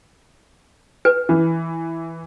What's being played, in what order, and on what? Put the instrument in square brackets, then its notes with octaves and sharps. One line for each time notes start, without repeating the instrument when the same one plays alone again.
[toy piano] B4
[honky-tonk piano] E3